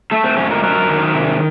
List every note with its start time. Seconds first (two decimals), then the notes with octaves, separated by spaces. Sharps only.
0.11 A3 A4
0.24 C4
0.37 F2 C#4
0.51 A#4
0.63 F#3 A#4
0.89 D#3
1.14 C3